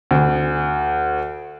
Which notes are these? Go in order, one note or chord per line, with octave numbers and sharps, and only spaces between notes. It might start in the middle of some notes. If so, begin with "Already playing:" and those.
D2